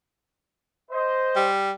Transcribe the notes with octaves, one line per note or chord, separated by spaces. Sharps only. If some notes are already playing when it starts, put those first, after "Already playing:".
C5 D#5
G3